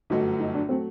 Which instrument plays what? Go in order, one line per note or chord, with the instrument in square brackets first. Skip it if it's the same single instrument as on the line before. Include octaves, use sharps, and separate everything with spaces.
[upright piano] G1 F#2 F#3 A3 [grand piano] D#4
[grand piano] D#4
D4
[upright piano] F#3 A3 [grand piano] C4